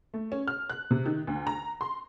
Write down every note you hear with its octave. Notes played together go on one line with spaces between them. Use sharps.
A3
C#4
F6
F#6
C3
D#3
D2
A#5
C6